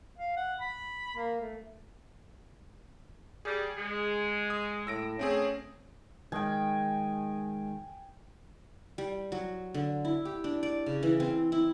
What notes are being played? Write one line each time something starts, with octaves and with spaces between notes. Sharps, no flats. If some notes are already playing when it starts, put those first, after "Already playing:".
F5
F#5
B5
A#3
A3
G3 G#4
G#3
D#6
A2 E6 A#6 D7
A3 C4 C#4 G#4
D#3 G#3 G5 G#5
G3
F#3
D3
E4
G4
D4
D5
C#3
E3
C4
E4